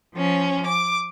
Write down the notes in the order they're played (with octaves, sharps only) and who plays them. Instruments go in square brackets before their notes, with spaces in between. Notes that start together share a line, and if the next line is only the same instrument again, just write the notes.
[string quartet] F3 C#4
D6